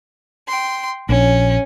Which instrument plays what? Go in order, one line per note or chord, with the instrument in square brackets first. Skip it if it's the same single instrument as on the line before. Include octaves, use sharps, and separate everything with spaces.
[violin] G5 C6
[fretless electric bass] A#1 [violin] C#4